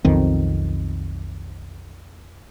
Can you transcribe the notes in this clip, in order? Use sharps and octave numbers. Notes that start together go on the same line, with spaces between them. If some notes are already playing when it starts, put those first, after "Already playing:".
B1 F2 D#3 C4